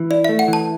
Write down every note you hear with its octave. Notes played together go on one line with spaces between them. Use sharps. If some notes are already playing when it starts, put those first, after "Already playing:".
Already playing: E3
E4 D5
A3 E5
F#5
E3
A5